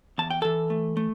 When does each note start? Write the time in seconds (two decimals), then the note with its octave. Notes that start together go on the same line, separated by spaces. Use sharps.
0.18 E2 A5
0.30 G5
0.42 E3 A4 A5
0.70 A3
0.97 A3